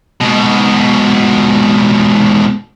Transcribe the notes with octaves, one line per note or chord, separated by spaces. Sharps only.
G#2 B2